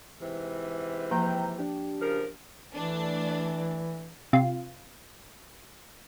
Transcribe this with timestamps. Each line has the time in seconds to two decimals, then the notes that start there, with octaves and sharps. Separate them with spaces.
0.20 G#2 C3 E3
1.11 F3 A#3 G5 A#5 G6
1.58 D4 G4
2.01 C#3 F3 A#4
2.75 E3 A3 D4
4.33 C3 F4